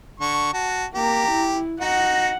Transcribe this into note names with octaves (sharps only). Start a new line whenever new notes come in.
D3 C#6
F#4 A5
A#3 G4 A#5
E4
D#4 F#4 F#5